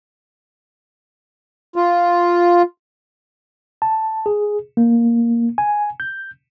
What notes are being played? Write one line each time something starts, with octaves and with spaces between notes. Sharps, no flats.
F4
A5
G#4
A#3
G#5
G6